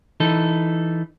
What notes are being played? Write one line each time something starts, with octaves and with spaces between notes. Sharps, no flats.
E3 D#4 A4